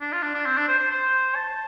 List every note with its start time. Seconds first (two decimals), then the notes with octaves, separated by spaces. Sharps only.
0.01 D4
0.12 F4
0.22 D4
0.34 D4
0.46 C4
0.57 D4
0.68 C5
0.79 C5
0.91 C5
1.35 A5